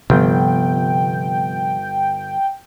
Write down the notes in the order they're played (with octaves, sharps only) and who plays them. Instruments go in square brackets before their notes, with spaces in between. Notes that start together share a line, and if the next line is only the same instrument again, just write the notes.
[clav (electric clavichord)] G1 [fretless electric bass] C3 F3 B3 [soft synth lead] G5